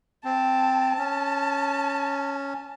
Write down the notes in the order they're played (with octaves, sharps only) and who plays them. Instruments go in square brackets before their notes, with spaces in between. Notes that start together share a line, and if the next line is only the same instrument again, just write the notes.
[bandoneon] C4 [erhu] A5
[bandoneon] C#4